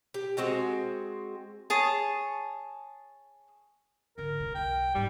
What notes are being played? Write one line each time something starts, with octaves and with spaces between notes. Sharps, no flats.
G4
G#3 C4 F#4 D#5
G#4 C#5 A5
G#1 D3 A#4
E2 C3
B1 A#3 G5
G#2 G3 D4